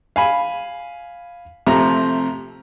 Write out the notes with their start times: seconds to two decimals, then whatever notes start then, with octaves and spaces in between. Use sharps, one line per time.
0.16 F5 G#5 B5
1.67 C3 F3 A3 A#5